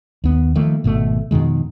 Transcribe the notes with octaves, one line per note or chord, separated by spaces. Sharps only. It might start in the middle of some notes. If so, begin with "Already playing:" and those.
D#2 B3
D#3 F3 A3 A#3
G#1 B2 D#3 A3
F2 B2 D#3 G#3